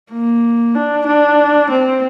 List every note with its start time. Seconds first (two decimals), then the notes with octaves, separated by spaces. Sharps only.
0.12 A#3
0.75 D4
1.07 D4
1.70 C4